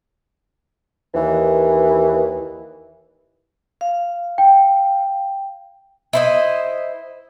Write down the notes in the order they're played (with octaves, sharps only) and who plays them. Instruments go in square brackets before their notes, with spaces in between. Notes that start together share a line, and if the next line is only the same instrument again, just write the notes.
[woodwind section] D#2 E3
[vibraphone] F5
[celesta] G5
[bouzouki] E4 C5 D#5